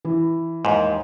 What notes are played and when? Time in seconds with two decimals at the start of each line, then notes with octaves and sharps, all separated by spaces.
0.05 E3
0.65 D#2 G#2